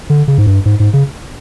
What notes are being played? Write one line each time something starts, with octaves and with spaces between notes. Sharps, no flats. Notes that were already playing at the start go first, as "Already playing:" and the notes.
D3
C#3
G#2
G2
G#2
G#2
C#3